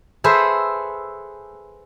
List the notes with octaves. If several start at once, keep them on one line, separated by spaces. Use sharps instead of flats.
G#4 A4 B4 C5 E5